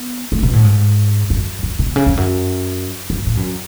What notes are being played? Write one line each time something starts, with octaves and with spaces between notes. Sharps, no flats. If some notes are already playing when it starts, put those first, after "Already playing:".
Already playing: B3
A3
B2
A2
G#2
F#2
F#2
B2
C#3
F2
F#2
F#2
A2
F#2